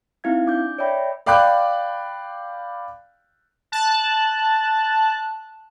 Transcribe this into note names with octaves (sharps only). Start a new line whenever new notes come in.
C4 D#4 E4 F5 G#6
D4 D6 G6
C#5 D5 E5 G5 B5
D5 F5 G5 B5 D6 F#6
A5 F#6